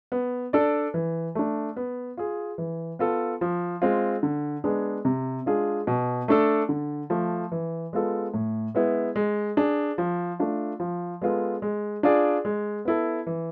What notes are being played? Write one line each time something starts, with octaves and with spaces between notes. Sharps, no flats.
B3
D4 A4 D5
E3
A3 D4
B3
F4 G#4
E3
B3 F4 A4
F3
G#3 C4 F4
D3
G#3 B3 D4 G#4
C3
G#3 D4 F4 G#4
B2
A3 D4 A4
D3
F3 A3
E3
G#3 B3 F4 A4
A2
G#3 B3 E4
G#3
D4 G#4
F3
A3 D4 F4
F3
G#3 B3 F4 A4
G#3
D4 F4 G#4 D5
G#3
B3 E4 A4
E3